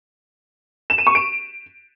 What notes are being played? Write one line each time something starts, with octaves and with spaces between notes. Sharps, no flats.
E7
D#7
C#6
D7